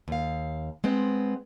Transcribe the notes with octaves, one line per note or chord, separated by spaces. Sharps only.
D#2 F5
G#3 B3 C4